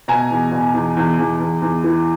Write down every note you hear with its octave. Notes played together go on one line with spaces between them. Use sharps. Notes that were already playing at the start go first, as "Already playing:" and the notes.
B2 G#5 A#5
E2
B2
E2
E2
E2
E2
E2
E3